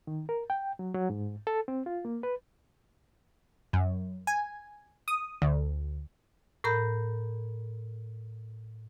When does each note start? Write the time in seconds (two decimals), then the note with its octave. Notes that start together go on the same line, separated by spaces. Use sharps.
0.07 D#3
0.29 A#4
0.50 G5
0.79 F#3
0.94 F#3
1.10 G#2
1.47 A4
1.68 C4
1.86 F4
2.05 A#3
2.23 B4
3.73 F#2
4.27 G#5
5.08 D#6
5.42 D2
6.64 A2 A#4 A#5 B5 G6